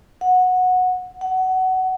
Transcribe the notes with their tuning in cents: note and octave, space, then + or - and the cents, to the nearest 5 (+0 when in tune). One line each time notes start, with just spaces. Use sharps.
F#5 -15
F#5 +20